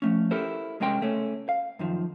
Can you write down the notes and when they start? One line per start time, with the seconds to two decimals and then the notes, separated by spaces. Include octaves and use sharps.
0.02 F3 A3 C#4
0.31 E4 G4 A4 A#4 C5
0.80 C2 G#3 C#4 A#4 G5 C6
1.01 C#2 A3 C#4
1.49 F5
1.79 F#2 D#3 F3